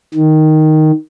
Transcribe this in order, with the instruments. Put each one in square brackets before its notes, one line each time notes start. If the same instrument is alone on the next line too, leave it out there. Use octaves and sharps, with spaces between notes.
[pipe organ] D#3